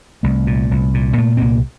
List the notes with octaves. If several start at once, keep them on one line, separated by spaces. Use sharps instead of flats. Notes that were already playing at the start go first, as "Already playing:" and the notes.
C2 A3
A#2
C2
A#2
A#2 A3
C4
C2 A#3